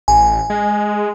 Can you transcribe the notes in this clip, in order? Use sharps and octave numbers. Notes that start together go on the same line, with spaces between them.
A1 G#5
G#3